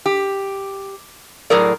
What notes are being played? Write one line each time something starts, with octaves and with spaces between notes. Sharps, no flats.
G4
A2 F#3 G#4 A#4 D5